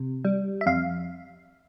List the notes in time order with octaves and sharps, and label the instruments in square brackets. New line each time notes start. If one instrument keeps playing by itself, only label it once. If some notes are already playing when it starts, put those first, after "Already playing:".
Already playing: [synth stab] C3
G3
E5
F2 F5